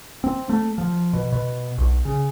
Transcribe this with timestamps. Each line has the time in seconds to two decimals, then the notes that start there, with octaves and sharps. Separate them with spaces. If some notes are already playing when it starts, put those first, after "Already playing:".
0.24 C4
0.49 A3
0.78 F3
1.13 B2
1.32 B2
1.78 B1
2.05 C#3